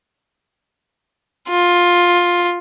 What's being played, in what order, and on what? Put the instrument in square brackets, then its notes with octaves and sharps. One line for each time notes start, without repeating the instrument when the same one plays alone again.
[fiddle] F4